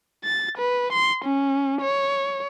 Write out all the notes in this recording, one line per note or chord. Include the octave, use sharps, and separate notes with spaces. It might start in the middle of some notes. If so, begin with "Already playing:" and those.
A6
B4
C6
C#4
C#5